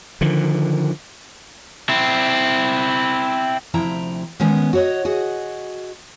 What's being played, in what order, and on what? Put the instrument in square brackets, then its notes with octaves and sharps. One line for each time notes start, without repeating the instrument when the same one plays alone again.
[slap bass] D3 D#3 F3
[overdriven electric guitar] C4 E4
[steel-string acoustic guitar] D2 C3 F3 E4 G5 A#5
D#3 G#3 B3 C#4
F#4 C#5 D#5
F#4 G#4 D#5